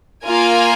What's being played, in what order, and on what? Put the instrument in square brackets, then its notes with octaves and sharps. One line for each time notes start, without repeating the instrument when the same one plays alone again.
[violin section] A#3 F4 A#4 F5 G#5